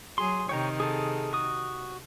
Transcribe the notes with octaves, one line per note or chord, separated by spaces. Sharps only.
F#3 G#4 C6
C3 D#3 C#5 G5 A#5
G#4 A4
F#4 D#6